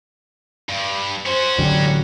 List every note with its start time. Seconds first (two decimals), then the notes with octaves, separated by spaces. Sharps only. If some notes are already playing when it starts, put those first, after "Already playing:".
0.69 G2
1.26 C#4 F#4 C5
1.58 A1 D3 F#3 G3